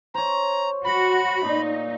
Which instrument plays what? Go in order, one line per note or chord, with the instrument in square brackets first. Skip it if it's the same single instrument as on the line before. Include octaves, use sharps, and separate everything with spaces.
[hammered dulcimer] C5 C#5 [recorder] A#5
[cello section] F#4 [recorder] B5
[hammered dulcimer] A#2 [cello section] D#4